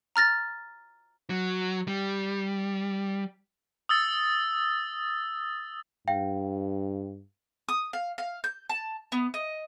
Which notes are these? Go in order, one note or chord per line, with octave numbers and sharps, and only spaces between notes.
A#5 F6 A6 A#6
F#3
G3
D#6 E6 A6
G2 F5 G5
D#6
F5
F5
G6
A5
B3
D#5